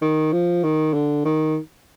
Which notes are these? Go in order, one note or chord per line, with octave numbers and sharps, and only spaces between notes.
D#3
F3
D#3
D3
D#3